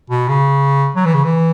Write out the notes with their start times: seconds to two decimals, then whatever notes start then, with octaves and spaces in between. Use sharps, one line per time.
0.10 B2
0.28 C#3
0.96 F#3
1.05 E3
1.14 C#3
1.24 E3